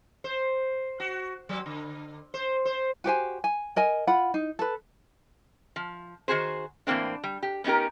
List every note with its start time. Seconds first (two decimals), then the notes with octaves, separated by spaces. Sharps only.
0.24 C5
1.00 F#4
1.49 F#3
1.66 D3
2.34 C5
2.65 C5
3.04 F#4 G4 C5 G#5
3.44 G#5
3.76 A#4 D#5 G#5
4.07 F4 F#5 B5
4.34 D#4
4.59 A4 B4
5.76 F3
6.28 D#3 F#4 G#4 C5
6.87 A2 E3 A#3 C4 D4
7.24 G3
7.43 G4
7.64 B3 C#4 D#4 G4 A#4